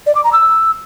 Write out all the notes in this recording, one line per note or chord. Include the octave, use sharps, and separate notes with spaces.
D5
D6
A#5
E6